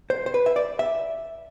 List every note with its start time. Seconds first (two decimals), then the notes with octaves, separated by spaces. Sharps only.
0.10 C5
0.26 C5
0.34 B4
0.46 E5
0.56 D5
0.79 E5